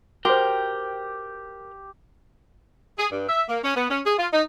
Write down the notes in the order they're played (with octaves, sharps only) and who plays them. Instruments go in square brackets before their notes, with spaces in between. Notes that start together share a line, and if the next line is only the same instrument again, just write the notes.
[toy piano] F#4 C5 [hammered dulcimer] G4 [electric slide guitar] A#4 G5
[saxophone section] G#4
G2
E5
A#3
C#4
B3
C#4
G#4
F4
D#4